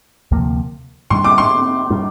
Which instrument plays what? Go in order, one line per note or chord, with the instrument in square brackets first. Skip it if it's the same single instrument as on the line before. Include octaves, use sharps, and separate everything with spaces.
[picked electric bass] D2 C3 F3 A#3
[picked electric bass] A2 G3 D4 [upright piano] C6
[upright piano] D6
C6
[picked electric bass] A2 G3 D4